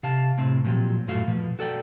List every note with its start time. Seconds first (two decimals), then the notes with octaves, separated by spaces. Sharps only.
0.03 C3 F5 A5
0.38 A2 C3 C4
0.64 A#2 F3 F#3 G4
1.08 F#2 A2 A3 F#4 F5
1.28 B2 F3
1.59 F#4 A4 D5 G5